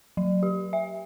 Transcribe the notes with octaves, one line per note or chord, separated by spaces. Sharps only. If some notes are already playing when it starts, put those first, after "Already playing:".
F#3
G4
E5